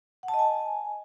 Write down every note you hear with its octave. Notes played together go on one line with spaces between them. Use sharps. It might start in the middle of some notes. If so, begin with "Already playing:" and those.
F#5
A5
D#5
G#5